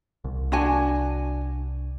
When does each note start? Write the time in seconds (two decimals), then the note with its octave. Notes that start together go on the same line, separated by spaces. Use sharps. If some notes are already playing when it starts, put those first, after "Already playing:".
0.24 C2
0.52 D4 F#4 G#5